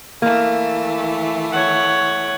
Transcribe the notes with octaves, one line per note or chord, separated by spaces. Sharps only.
E3 A3 A#3
C#5 F#5